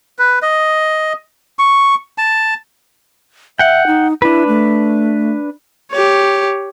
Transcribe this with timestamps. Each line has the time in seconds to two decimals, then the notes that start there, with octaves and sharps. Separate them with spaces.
0.19 B4
0.42 D#5
1.59 C#6
2.18 A5
3.59 E5 F#5 G5
3.87 D#4
4.22 D4 E4 B4
4.48 A3
5.91 G4 C#5